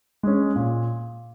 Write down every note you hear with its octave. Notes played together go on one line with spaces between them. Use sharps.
G#3 C#4
A#2